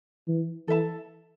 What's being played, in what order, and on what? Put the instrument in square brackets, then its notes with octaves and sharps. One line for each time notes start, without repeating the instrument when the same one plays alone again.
[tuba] E3
[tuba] E3 [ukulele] A4 E5 A5